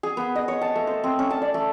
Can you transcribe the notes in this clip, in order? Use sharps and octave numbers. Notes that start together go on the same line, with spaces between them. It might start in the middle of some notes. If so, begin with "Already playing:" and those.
G#4
B3
D#5
C#5
A5
A3
C5
C4
C#4
A5
D5
A3